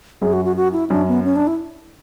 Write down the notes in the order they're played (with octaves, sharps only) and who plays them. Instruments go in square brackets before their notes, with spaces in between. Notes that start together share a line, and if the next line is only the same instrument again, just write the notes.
[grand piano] F#2 F#3 [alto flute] G#4
[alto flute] F#4
F#4
F#4
E4
[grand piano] F#2 F#3 [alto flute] D4
[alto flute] B3
C#4
D4
E4